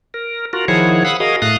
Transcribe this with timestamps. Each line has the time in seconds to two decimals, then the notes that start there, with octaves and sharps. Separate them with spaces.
0.14 A#4
0.53 F4 F#4 A#4
0.68 D#3 F3 E4 G#4 C#5 F#5
1.05 F5 F#5 B5 D#6 E6 F#6
1.20 F#4 G#4 A#4 D#5 F5 D#6
1.42 A2 A3 F5 D#6 F#6